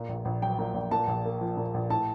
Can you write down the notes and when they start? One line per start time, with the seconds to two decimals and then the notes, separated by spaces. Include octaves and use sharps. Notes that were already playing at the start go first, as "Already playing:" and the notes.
Already playing: A#2
0.09 A#1
0.25 A#1
0.42 F#3 G5
0.59 A#2
0.74 A#1
0.91 A#2 A5
1.08 A#1
1.25 A#3
1.41 F3
1.57 A#2
1.74 A#1
1.90 A2 A5